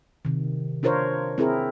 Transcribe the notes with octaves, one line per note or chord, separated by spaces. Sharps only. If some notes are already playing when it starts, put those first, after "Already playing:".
C3 D#3
D4 F4 A#4 C5 C#5
C4 E4 G#4 A#4